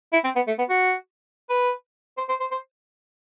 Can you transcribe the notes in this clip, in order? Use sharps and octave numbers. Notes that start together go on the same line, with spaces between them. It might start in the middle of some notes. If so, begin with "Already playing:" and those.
E4
C4
B3
A3
B3
F#4
B4
C5
C5
C5
C5